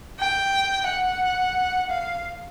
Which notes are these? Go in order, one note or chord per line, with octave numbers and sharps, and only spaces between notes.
G5
F#5
F5